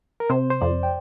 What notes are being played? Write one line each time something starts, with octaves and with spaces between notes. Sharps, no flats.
A#4
C3 C5
C5
F2 D5
G5